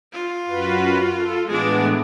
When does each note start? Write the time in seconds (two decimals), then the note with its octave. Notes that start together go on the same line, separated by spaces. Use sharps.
0.13 F4
0.48 F#2 F#4 B4
1.18 A4
1.47 A2 E3 G#3 B3 D4